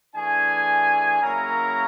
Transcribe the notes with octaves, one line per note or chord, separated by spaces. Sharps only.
E3 A3 D4 G#4 G#5
C#3 F#3 A#3 C#4 E4 A#4 A#5